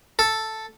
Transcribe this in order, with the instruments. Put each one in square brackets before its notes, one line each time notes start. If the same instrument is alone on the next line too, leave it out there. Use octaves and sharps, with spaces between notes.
[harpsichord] A4